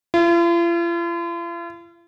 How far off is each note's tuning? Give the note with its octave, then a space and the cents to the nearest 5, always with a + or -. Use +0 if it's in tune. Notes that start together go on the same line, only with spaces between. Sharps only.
F4 -45